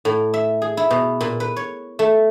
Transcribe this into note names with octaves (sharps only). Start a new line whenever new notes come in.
A2
E5
G#4
E4
B2
A#2
B4
C#5
A3